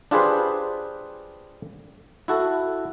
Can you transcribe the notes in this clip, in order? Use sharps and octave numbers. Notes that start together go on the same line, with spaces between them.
D4 F4 G4 G#4 B4 C5
E4 F#4 A4